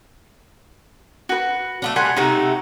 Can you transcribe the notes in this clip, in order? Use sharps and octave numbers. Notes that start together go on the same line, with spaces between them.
F#4 B4
A3 B3 D4
G3 F#5 G#5 C6
C3 A3 D#4 F#4